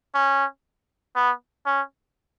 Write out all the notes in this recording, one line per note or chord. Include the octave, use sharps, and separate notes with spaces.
C#4
B3
C#4